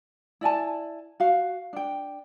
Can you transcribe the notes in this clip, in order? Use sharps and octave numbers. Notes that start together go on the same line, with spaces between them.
E4 D5 G#5 A5
F#4 F5
D4 G5